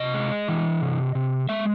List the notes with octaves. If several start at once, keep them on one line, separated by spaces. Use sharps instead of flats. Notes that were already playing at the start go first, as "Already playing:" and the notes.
Already playing: C3 D#5
G#3
E3
C3
C3
G#3 E5